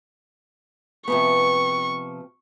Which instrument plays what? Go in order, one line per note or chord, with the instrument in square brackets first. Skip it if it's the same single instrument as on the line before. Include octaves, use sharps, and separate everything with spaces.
[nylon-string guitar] C3 F3 B3 [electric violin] C#6